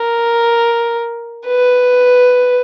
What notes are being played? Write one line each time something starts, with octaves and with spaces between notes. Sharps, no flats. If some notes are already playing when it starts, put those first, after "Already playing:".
Already playing: A#4
B4